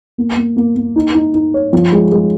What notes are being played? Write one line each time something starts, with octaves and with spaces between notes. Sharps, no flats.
A#3
A#3
A#3
A#3
D#4
D#4
D#4
C#5
F3
G#3
G#3